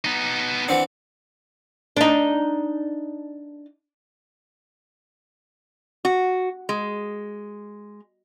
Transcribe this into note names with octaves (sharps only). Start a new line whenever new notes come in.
B3 D#4
E3 C4 D4 F#5
D4 D#4
F#4
G#3